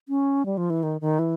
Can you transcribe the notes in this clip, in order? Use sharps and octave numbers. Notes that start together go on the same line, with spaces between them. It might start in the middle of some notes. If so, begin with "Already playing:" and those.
C#4
G3
F3
E3
D#3
D#3
E3